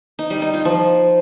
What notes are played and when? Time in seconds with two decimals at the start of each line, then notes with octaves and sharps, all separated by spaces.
0.19 D#4
0.30 G3
0.42 D#4
0.54 F4
0.65 F3